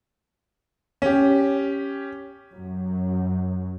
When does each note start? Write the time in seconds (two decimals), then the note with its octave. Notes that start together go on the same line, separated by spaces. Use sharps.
1.02 C#4 G4
2.54 F#2 F#3